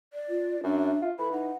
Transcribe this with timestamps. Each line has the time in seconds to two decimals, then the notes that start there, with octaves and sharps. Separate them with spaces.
0.13 D5
0.29 F4
0.64 F#2 D4 E5
1.02 F4
1.19 E3 A4 B5
1.32 D#4 F#5